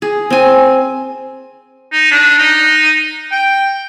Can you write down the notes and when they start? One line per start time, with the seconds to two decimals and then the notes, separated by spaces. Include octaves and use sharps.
0.02 G#4
0.30 C4 G#5
1.92 D#4
2.11 D4
2.38 D#4
3.32 G5